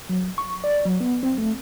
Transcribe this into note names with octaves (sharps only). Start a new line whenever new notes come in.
F#3
C#6
D5
F#3
B3
C4
A3